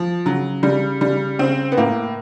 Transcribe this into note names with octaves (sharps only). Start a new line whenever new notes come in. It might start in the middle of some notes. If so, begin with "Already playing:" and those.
Already playing: F3
C#3 F#3
C#3 G3
C#3 G3
C#3 C4
B3
A2 A#3